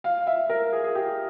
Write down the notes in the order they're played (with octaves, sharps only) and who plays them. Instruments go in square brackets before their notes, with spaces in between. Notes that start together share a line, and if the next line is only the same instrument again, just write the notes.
[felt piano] F5
E5
A#4
G#4
G#4
G4